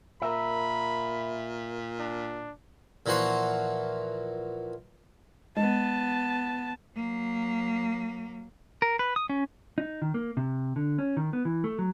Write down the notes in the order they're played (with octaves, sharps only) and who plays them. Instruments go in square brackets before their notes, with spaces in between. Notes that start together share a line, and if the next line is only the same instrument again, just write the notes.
[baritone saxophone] A#2 [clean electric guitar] A#4 E5 [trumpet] B5
[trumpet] D4
[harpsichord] A#2 E3 F3 F#4 C6
[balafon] G#3 [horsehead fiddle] B3 A5
[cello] F#3 A#3
[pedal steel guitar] A#4
B4
D#6
C#4
[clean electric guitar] D#4
D#3
A#3
C3
D3
C#4
D#3
B3
E3
A3
F#3